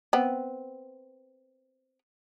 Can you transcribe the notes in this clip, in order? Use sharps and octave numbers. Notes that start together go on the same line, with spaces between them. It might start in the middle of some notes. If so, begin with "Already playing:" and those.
B3 C4